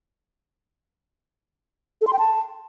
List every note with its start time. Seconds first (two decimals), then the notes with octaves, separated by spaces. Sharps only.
2.01 A4
2.07 C6
2.13 G5
2.19 A5